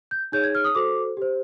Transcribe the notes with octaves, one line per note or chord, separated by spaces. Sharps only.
G6
D#4 G#4 C#5 G6
G#6
F6
D#6
F#4 A4 C5 D6
G4 C5